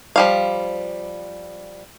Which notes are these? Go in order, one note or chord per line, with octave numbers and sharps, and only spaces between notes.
F3 G3 F5